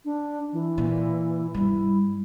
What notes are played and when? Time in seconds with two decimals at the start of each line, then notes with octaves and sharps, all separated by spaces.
0.05 D4
0.53 E3
0.78 A#2
1.54 G2 G3 E4